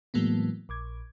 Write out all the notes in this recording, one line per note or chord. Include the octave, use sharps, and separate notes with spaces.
A2 E3 F#3 G#3 A#3 B3
A#1 D6 G#6